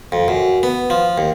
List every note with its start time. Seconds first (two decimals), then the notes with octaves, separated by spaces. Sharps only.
0.12 F2
0.28 F#2
0.63 B3
0.90 F3
1.18 D#2